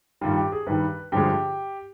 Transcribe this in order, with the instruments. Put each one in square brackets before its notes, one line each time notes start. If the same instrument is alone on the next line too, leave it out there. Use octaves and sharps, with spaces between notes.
[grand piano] G2 D#3 G3 F4
G4
G#4
G2 D#3 G3 B4
G2 D3 F3 G#3 G4